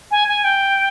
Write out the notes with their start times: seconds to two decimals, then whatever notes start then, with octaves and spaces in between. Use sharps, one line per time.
0.11 G#5
0.28 G#5
0.44 G5